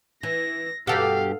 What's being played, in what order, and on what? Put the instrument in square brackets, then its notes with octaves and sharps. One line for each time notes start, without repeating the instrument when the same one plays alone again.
[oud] E3 [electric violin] A#6
[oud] G2 B2 [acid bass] G4 [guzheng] A4 F#5 [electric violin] F5